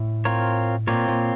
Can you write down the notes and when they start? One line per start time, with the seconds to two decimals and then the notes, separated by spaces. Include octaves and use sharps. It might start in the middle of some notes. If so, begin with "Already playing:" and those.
Already playing: A2
0.25 C4 F4 A#4 C#5
0.87 A#2 C4 F4 A#4 C#5
1.08 A#2